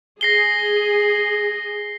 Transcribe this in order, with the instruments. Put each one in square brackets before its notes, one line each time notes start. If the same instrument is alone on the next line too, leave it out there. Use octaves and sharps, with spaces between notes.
[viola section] G#4 [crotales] A#6 C7 G7